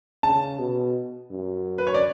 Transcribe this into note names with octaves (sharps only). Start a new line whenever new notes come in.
C#3 A5
B2
F#2
B4
C#5
D5